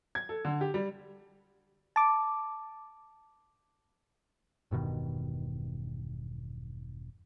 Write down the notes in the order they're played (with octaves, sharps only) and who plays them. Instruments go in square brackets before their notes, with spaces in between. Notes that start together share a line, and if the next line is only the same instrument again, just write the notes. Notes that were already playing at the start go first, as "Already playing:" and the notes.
[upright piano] G#6
A4
D3
G4
G3
[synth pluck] A5 D6
[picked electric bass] E1 G2 B2 D#3